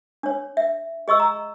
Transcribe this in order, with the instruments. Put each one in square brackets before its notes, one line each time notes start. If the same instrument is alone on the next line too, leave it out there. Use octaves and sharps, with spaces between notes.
[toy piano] D4 C#5
E5
G#4 D#5 C#6 E6
A#5